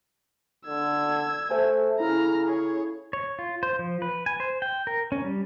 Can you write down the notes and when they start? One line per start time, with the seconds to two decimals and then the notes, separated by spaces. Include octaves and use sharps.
0.67 D3 E6 G#6
1.50 A3 A4 C5 G#5
2.00 C#3 E4 A4 A#5 F6
2.46 G#4 C#5
3.13 C#5
3.39 F4
3.63 C5
3.79 F3
4.02 B4
4.26 G#5
4.40 C5
4.62 G5
4.87 A#4
5.12 C#4
5.24 G3